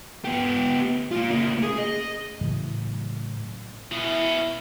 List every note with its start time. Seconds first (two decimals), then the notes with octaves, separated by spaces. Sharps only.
0.24 B3 G4
1.11 A#3 F4
1.30 C#3 A#3
1.63 G#4
1.78 D#5
2.41 A2 C#3 E3 F#3
3.92 B2 C#4 E4